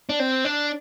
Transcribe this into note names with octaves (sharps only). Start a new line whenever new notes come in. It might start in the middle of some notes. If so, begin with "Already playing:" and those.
D4
C4
D4